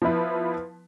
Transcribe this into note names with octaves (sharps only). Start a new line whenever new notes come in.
F3 B3 E4 B4